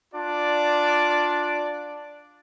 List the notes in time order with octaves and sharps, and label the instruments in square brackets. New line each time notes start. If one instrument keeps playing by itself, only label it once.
[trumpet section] D4 F4 D5